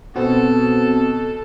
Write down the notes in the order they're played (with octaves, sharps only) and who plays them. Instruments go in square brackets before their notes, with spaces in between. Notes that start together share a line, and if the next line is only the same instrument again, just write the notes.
[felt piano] B2 [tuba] B3 [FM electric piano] C4 F#4 [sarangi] A4